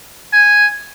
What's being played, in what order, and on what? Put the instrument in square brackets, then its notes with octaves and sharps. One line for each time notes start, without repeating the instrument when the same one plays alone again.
[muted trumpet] G#5